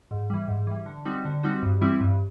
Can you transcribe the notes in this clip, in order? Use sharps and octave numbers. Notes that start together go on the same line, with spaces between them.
G#2
E3 G3
G#2
E3 G3
D3
G3 C4 D#4 F#4
D3
G3 C4 D#4 F#4
G2
E3 G3 C4 E4
G2